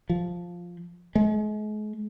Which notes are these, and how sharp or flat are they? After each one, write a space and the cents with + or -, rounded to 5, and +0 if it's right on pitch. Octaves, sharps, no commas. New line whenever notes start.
F3 +5
G#3 +40